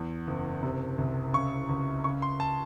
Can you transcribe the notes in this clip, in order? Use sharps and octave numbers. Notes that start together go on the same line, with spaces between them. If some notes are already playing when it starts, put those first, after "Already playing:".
Already playing: E2
F#1
C3
C2
C#3 C#6
C#2
C#3 C#6
C6
A5